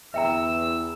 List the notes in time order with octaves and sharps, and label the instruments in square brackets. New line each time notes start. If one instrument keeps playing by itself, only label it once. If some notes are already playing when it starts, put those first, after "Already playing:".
[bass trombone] E2 [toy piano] E5 G5 A#5 [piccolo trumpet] E6